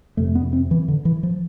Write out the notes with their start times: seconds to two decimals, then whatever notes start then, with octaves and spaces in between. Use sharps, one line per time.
0.17 F2 C3 A3
0.35 B3
0.53 C4
0.71 E3
0.88 D3
1.05 E3
1.23 F3